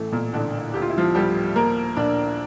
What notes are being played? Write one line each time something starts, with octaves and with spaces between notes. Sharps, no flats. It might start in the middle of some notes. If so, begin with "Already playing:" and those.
Already playing: A1 E3 A3
A#2 A#3
A1 D3 D4
D2 G4
F4
E4
F3 F4
D2 G3 G4
F3 A#3 A#4
A#1 D4 D5